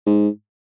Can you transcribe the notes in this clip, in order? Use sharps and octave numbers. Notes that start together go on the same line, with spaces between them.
G#2